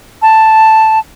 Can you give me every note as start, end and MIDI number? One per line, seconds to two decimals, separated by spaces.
0.22 0.99 81